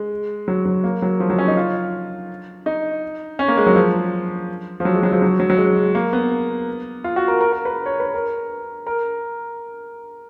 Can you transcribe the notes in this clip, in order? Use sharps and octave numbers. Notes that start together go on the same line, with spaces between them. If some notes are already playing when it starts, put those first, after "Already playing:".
Already playing: G#3
F#3
F#3
A#3
F#3
F3
F#3
C#4
D#4
F4
D#4
C#4
A#3
G#3
F#3
F3
F3
F#3
G#3
F#3
F3
F#3
F#3
F#3
G#3
A#3
B3
F4
F#4
A#4
A#4
A#4
B4
C#5
B4
A#4
A#4